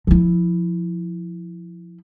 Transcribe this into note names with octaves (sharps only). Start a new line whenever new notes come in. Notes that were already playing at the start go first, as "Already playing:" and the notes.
F3 E4